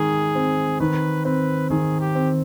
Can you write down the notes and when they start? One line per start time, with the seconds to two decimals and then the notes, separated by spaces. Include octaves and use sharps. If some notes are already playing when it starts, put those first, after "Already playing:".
Already playing: D#3 G#3 G#4
0.35 C4
0.80 D#3 B4
1.25 C4 B4
1.70 D#3 G#4
2.00 G4
2.15 C4